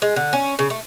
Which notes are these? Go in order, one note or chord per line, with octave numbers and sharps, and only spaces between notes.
G#3
D3
C#4
C#3
A3